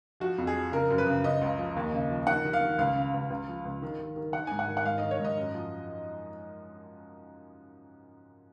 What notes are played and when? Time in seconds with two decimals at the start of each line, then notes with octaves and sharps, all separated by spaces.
0.20 F3 F#4
0.38 F2
0.47 G#4
0.55 F3
0.72 C#3 A#4
0.90 F#2
0.98 B4
1.07 C#3
1.24 C#3 D#5
1.42 C#2
1.59 F3
1.76 D#2
1.93 C#3
2.11 F3
2.27 D#3 F#5
2.45 D#3
2.53 F5
2.61 D#3
2.78 C#2 F5
2.96 C#3
3.14 C#2
3.30 C#2
3.48 F3
3.65 C#2
3.82 D#3
3.99 D#3
4.16 D#3
4.33 D#3 F#5
4.47 G#2 G#5
4.59 F#5
4.68 D#3
4.77 F#5
4.85 G#2 F5
4.98 D#3 D#5
5.11 C#5
5.20 G#2
5.25 D#5
5.37 F#2
5.54 F3